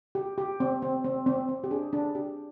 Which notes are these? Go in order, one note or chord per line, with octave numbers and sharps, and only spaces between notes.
G4
G4
C4
C4
C4
C4
C4
G4
D4 G#4
D4
G4